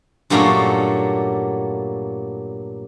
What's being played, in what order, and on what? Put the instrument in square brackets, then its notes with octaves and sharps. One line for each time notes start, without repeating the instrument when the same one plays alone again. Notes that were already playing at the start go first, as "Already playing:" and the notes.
[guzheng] G2 A#2 F#3 A3 A#3 C#4